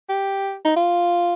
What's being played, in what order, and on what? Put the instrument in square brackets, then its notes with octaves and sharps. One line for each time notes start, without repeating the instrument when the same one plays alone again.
[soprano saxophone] G4
D#4
F4